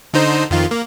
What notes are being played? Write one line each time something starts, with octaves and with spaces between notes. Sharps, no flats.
D3 D#4 C5
F2 D#3 F4
A#3